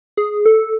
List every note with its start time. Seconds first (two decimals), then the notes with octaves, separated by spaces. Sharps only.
0.17 G#4
0.46 A4